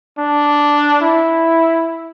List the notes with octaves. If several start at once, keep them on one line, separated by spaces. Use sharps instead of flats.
D4
E4